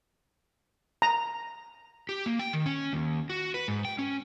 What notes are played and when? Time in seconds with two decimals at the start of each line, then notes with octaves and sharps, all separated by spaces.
1.02 A#5
2.09 G4
2.26 A#3
2.39 G5
2.53 D#3
2.66 C#4
2.93 D#2
3.30 F#4
3.54 B4
3.68 G#2
3.85 G5
3.99 C#4